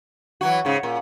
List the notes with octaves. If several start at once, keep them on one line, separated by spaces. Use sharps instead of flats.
E3 F#3 F#4
G#2 C#3
A#2